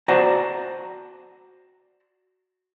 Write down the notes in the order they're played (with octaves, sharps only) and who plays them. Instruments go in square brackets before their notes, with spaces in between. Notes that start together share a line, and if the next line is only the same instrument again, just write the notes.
[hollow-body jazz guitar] F#4 C5 D5 F#5 A5 A#5